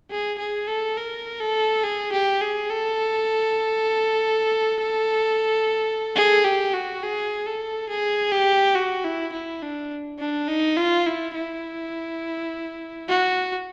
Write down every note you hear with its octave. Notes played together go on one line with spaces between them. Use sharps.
G#4
G#4
A4
A#4
A4
G#4
G4
G#4
A4
G#4
G4
F#4
G#4
A4
G#4
G4
F#4
E4
E4
D4
D4
D#4
F4
E4
E4
F#4